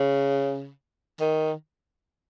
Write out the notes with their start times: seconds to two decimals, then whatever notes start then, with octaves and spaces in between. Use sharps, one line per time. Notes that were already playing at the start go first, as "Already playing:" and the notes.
Already playing: C#3
1.20 D#3